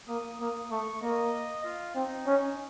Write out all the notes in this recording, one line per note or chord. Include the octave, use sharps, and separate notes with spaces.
A#3 D#6
A#3 D#6
A3 C#6
A#3 D#5
F4
C4 D#4
C#4